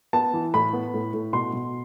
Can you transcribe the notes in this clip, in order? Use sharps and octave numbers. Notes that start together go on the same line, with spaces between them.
B3 A5
E3
A2 B5
B3
A2
A2
B2 C6
B2